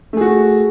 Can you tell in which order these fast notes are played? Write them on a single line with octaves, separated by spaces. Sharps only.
A3 G#4 F#4